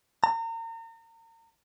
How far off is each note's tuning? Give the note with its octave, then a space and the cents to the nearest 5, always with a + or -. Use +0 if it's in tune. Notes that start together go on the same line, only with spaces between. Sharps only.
A#5 -35